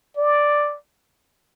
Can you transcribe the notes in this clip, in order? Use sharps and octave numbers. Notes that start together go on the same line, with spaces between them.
D5